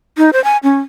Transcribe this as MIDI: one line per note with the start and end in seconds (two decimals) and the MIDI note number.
0.18 0.30 63
0.33 0.42 72
0.44 0.57 80
0.63 0.79 61